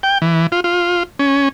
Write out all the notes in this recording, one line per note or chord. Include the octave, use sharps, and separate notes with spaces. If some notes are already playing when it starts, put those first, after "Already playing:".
G5
E3
F4
F4
C#4